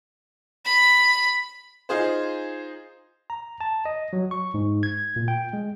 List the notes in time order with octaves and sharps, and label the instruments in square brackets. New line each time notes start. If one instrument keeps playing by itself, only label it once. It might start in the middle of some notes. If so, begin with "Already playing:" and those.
[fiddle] B5
[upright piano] D#4 F4 G#4 C5
[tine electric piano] A#5
A5
D#5
F#3
C#6
G#2
G#6
A#2
G5
G#3